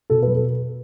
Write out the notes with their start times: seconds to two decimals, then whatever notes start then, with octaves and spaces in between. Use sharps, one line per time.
0.10 B2 A4
0.23 B4
0.27 F#3
0.35 A4